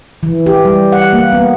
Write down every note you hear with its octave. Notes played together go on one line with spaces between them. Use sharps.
E3
G4
G3
F#5
A#3
B3